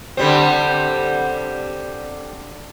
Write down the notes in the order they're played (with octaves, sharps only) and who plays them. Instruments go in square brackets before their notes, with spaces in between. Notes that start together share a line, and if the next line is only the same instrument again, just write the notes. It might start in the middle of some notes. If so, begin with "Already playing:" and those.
[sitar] D3 G3 C4